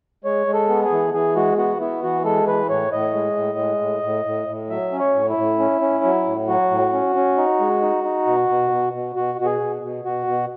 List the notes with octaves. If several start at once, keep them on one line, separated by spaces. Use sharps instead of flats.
G#3 C#5
G#3
A4
B3
G#4
E3
E3 G#4
G#3 F#4
B3 F#4
B3 E4
E3 F#4
G#3 A4
E3 B4
A2 C#5
A2 D#5
G#3
A2
G#3
A2
A2
A2
A2
F#3 E5
C#4
C#5
A2
E4
A2
C#4
C#4
F#3
A2
F#3 F#4
A2
C#4
C#4
D#4
G#3
D#4
D#4
B2
B2
B2
B2
B2 F#4
B2 F#4
G#4
B2
B2
B2 F#4
B2